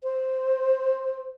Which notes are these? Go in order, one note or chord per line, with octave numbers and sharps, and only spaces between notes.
C5